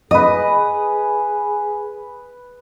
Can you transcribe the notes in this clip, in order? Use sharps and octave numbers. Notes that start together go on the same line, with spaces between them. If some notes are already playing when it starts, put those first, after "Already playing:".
G#4 B4 D#5 D#6